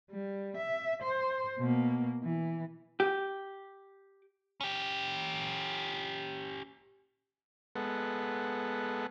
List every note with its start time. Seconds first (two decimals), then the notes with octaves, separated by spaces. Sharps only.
0.11 G3
0.57 E5
1.02 C5
1.59 B2 A#3
2.24 E3
3.00 G4
4.61 C#4 G4
7.76 G#3 B3 A4 F#5